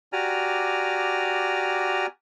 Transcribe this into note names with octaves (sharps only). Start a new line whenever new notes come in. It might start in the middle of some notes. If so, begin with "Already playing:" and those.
F#4 G4 D5 G#5 A#5 F6